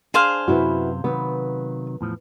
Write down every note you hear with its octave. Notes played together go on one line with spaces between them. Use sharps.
D4 G#4 C5 F5
F#2 C3 B3 E4 F#4
C3 D#3 F#3 B3
E2 A2 F3